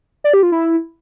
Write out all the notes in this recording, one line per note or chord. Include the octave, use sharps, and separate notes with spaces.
D5
G4
F4
E4